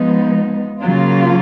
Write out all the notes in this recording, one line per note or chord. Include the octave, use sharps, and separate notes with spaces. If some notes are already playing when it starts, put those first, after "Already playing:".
Already playing: F3 G#3 B3 D#4
C#3 F#3 A#3 F4